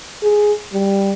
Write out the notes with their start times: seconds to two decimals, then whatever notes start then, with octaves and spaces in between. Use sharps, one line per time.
0.23 G#4
0.73 G3